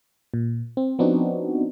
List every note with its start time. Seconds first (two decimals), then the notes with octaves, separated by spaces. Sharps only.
0.34 A#2
0.77 C4
0.99 F3 B3 C4 D4 D#4 F#4